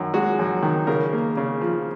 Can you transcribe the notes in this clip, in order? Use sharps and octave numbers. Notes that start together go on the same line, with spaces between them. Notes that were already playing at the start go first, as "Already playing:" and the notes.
Already playing: F#2 D#3
G#3 F#4
F#2
D#3
C#3 A#4
A#3
C#3
F3